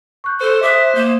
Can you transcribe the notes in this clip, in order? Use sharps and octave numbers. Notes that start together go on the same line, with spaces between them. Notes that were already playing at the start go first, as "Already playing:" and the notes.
C#6 F#6 G6
A4 C5
E5 D6 D#6 F#6
A#3 G6 E7